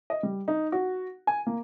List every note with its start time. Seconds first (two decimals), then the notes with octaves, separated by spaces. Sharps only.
0.10 D#5
0.23 G3
0.48 D#4
0.72 F#4
1.27 G#5
1.47 A#3